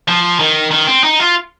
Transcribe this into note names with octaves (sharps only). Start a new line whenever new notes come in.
F3
D#3
D#3
C4
D#4
F4